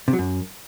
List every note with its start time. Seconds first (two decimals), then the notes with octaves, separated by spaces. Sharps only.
0.08 C3
0.13 F#3
0.19 F#2